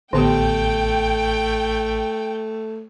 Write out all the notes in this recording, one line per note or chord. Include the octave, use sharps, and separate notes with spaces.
A1 D3 A3 B3 G4 G5